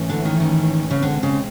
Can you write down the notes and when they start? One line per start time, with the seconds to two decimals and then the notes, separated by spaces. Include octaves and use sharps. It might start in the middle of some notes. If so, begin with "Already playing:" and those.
Already playing: G#2 E3 A3 C#4
0.09 D3
0.25 D#3
0.40 D#3
0.90 C#3
1.02 B2 D3 G#3 C4
1.23 C#3